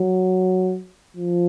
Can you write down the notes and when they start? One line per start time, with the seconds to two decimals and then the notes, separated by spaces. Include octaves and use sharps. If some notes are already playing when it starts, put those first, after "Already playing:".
Already playing: F#3
1.16 F3